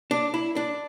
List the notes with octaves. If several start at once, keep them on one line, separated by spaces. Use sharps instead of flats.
D4
E4
D4